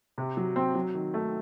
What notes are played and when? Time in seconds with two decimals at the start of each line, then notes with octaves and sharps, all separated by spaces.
0.18 C3
0.37 F#3
0.56 C4
0.75 F#3
0.94 D#3
1.14 A3